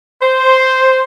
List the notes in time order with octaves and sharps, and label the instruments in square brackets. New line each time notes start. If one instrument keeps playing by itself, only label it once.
[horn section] C5